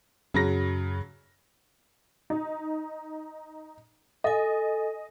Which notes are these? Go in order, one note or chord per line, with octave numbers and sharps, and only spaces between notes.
F#2 C#3 F#3 A#6
D#4
A4 D#5 G#5